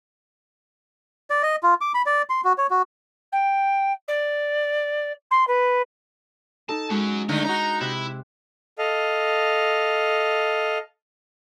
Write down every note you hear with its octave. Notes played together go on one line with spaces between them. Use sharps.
D5
D#5
F4
D6
B5
D5
C6
F#4
C#5
F#4
G5
D5
C6
B4
D#4 A4 A5
G#3 C#4 F#4
D3 A3 D#4
D#4 F#4 A#5
C3 E4 F#6
A4 D#5 F5